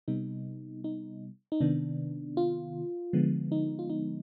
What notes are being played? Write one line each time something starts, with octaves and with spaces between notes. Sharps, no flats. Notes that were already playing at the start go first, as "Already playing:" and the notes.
C3 G3 B3 D#4
D#4
D#4
C3 D#3 B3 D4
F4
D3 F3 G#3 B3
D#4
F4
D#4